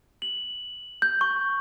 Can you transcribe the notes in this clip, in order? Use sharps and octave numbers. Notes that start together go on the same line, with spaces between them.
F#7
G6
C#6